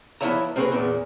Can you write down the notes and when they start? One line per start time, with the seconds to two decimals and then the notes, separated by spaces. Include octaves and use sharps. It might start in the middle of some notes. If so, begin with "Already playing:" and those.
0.21 F3 B3 E4 C#5 E5 A#5
0.56 A#3 C4 C#4 G#4 A#4 B4
0.72 E2 A#2